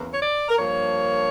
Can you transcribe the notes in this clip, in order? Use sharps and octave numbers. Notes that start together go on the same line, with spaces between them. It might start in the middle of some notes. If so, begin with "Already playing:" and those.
Already playing: E2 C#3 E3 A#3
C#5
D5
A#4
G2 F3 A#3 C#5